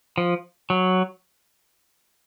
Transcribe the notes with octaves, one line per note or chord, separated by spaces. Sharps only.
F3
F#3